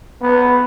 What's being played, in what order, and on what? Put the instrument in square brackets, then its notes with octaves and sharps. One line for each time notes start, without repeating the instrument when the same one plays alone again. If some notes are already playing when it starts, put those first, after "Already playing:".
[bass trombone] B3